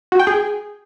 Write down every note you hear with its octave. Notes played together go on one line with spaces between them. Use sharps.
F#4
G5
G#4